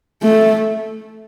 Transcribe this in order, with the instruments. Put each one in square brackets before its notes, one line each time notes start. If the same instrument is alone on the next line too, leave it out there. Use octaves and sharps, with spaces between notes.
[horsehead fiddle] A3